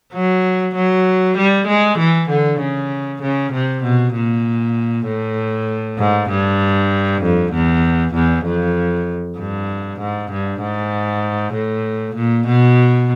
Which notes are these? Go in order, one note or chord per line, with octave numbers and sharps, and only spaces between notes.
F#3
F#3
G3
G#3
E3
D3
C#3
C#3
C3
B2
A#2
A2
G#2
G2
F2
E2
E2
F2
G2
G#2
G2
G#2
A2
A#2
B2